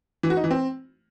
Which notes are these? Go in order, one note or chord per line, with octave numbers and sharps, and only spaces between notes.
E3
F#4
D#4
E3
C4